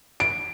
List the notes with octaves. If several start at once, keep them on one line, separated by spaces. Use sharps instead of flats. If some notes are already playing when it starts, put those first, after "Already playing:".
D7